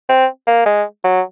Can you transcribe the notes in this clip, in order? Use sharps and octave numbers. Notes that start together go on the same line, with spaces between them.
C4
A#3
G#3
F#3